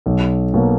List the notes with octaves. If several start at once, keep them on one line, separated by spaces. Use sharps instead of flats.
B1
B2 F#3 A#3